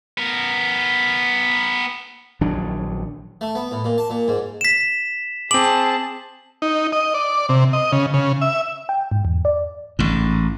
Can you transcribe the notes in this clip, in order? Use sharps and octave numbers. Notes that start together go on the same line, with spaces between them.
B3 A#4
A#1 D#3 F#3 D4
A3
B3
A2
A#2
A5
A#2
G#2
B6 E7
C4 G#4 A5 D6 F#7
D#4
D#5
D5
C3
D#5
C#3
C#3
E5
G5
G#2
E2
D5
A1 G#2